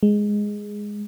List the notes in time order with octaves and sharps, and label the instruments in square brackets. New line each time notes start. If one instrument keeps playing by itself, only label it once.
[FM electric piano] G#3